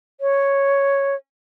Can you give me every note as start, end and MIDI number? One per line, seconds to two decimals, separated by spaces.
0.21 1.15 73